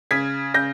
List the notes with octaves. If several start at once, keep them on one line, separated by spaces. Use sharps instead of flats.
C#3 G#6 B6
C#3 G6 A#6